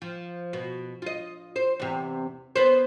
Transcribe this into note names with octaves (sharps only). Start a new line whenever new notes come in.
F3
B2
F4 D#5
C5
E2 C3
B3 B4 C5